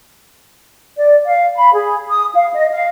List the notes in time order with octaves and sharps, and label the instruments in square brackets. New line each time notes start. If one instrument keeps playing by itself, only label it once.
[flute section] D5
F5
B5
G#4
D#6
F5
D#5
F5